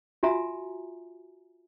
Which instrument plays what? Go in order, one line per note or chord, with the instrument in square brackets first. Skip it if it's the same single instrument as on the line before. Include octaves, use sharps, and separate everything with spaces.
[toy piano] F4 F#4 E5 G#5 A#5